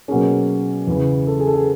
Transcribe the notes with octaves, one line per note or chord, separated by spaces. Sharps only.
B2 F#3 A#3 C#4 G#4
E2 C#3 E3
A4
G#4
A4
G#4